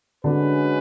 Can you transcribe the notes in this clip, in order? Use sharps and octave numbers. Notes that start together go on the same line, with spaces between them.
D3 G#3 C#4 D4 F#4 B4